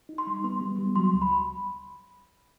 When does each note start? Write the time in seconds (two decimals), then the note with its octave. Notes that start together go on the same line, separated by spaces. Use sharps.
0.09 D#4
0.18 C6
0.27 G3
0.44 B3 C6
0.61 G3
0.78 G3
0.96 F#3 C6
1.13 C#2
1.22 B5